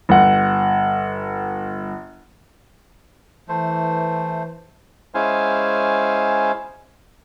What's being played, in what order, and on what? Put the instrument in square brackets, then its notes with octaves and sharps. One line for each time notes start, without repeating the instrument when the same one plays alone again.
[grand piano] G1 F#5
[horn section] E3 [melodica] A3 C5
[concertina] G#3 C#4 E4 C5 F5 G#5